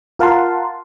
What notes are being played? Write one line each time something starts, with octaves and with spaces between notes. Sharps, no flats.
F4 A#4 F5 F#5 A5 C6